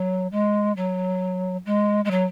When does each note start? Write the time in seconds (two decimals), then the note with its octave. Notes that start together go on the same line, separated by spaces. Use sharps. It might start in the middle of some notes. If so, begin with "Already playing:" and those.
Already playing: F#3
0.32 G#3
0.77 F#3
1.66 G#3
2.05 G#3
2.11 F#3